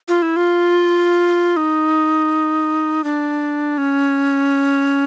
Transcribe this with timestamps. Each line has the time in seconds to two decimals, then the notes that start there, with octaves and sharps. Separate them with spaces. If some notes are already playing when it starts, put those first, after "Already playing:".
0.08 F4
0.22 E4
0.36 F4
1.57 D#4
3.04 D4
3.78 C#4